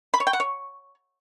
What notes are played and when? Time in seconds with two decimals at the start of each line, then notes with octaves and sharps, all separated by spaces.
0.14 B5
0.20 C#5
0.27 G5
0.33 F#5
0.40 C#5